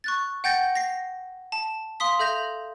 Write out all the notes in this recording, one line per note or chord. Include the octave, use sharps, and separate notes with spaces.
C#6 F#6 A6
F#5 G5 G6 A6 A#6 C#7
A#6 C7
A5
F5 C6 D#6 B6
A4 E5 G6 A#6 F7